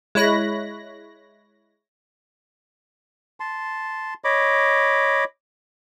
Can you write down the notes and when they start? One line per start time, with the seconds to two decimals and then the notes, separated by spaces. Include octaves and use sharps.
0.15 G#3 E4 C#5 B5 F#6 A#6
3.40 A5 C6
4.24 C#5 D#5 B5 D6